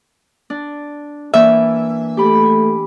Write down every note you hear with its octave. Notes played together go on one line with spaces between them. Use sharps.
D4
E3 A#3 D4 E5
A3 G4 B5